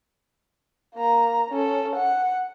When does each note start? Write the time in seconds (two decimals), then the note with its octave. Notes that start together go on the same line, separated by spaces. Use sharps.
0.95 A#3 A#5
1.50 C#4 A4
1.96 F#5